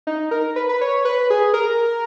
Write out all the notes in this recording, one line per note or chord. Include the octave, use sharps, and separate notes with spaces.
D#4
A#4
B4
B4
C#5
B4
G#4
A#4